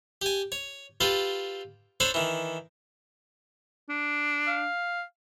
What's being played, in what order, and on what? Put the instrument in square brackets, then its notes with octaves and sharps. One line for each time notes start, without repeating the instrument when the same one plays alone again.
[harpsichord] G4 G#5
C#5
F4 G4 A4 B4
D4 A4 C5 C#5 B5
D#3 E3
[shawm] D4
[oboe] F5